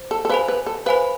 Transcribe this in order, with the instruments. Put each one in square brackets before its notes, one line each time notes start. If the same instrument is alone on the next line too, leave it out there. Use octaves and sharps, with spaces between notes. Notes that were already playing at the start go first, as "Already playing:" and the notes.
Already playing: [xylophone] C5
[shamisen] A4
A4
[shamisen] B4 [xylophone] C5 F5 G#5 B5
[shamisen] B4
A4
[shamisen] B4 [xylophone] C5 F5 G#5 B5